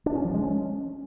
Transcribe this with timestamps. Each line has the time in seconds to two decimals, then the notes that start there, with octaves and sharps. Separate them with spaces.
0.06 D4
0.15 C#4
0.25 F3
0.34 G#3
0.43 C#4